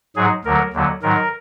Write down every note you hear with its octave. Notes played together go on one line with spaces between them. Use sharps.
G#2 F#3 G#4
D2 D3 F#3 A#4
D#2 D3 F#3
G#2 D#3 F#3 A#4